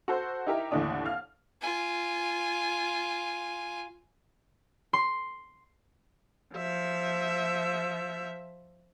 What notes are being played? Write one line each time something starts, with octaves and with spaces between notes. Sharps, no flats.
F#4 A4 C5
D#4 E4 G4 A#4 E5 A#5
D#2 A2 D3 E3 D4 D#6
F5 F6
F4 G#5
C6
F3 E5